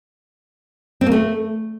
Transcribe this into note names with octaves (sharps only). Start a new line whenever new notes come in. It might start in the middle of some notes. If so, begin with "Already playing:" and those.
C4
A#3
A3